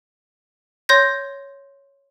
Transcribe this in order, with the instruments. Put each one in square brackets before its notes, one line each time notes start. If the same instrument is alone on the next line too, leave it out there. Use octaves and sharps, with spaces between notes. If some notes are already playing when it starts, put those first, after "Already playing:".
[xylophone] C#5 C6 G6 A#6